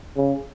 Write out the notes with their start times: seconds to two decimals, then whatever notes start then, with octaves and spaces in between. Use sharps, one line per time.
0.17 C#3